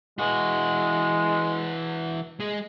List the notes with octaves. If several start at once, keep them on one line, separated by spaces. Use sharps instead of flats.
E3 G#3 F#4
G#3 G#4